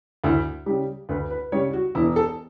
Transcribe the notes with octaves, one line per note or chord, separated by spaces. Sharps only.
D2 E4
C#3 G3 G4
D2 B4
B4
C#3 G3 C#5
F#4
E1 E4
A4